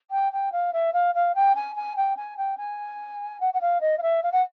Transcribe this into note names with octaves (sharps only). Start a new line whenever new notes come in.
G5
G5
F5
E5
F5
F5
G5
G#5
G#5
G5
G#5
G5
G#5
F#5
F#5
F5
D#5
F5
E5
F5
F#5